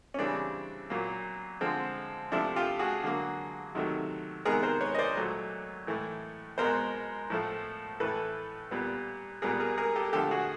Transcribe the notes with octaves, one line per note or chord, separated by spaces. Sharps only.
C#4
C#3 E3 G3 C4 D4
A#2 F#3 A#3
D3 F3 G#3 C4
C3 F3 A3 D4 E4
F4 G4
F#4 G#4
D3 F#3 A#3
C3 D#3 F#3 A3
C3 D#3 G#3 B3 G#4 A#4
A#4 C5
B4 C#5
D#5
C5 D5
A#2 F#3 A3
A2 E3 A3
B2 G#3 B3 A#4 C5
A2 F3 A3
A2 E3 A3 A4 B4
A#2 G3 B3
A#2 G3 B3 G#4 A#4
G#4 A#4
G#4 A#4
G4 A4
D3 F3 A3 G4 A4
F#4 G#4